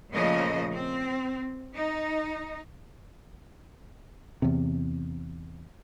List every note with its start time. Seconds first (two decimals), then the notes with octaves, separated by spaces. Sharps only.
0.12 A#2 C#3 F3 A3 D#5
0.72 C4
1.76 D#4
4.42 E2 C3